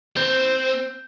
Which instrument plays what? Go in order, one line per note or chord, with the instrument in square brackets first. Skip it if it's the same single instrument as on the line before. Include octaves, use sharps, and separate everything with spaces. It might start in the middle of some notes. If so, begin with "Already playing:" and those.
[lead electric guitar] C4 [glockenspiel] G6